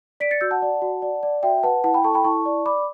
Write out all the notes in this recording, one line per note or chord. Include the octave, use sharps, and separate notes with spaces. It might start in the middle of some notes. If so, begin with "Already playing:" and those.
D5 B6 D7
A6 C#7
F#4 E6 G6
F#5 A5
D5
F#4
D5
D5
F#4 E5 G5
B4 F#5 A5
E4 F#5 A5
G5 B5
A4 A5 C#6
G5 B5
E4 A5 C#6
D5
D5 B5 D6